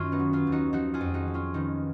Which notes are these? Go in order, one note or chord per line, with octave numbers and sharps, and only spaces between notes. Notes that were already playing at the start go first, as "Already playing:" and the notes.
Already playing: F#2 D#3 C#4 F4
B3 D#4
F#3
C#4 F4
D#2
D#4 F#4
F3 D#4 F#4
F4 G#4
F2
D#4 F#4
F3
C#4 F4
D#3 B3 D#4